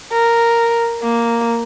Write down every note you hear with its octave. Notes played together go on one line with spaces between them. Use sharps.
A#4
A#3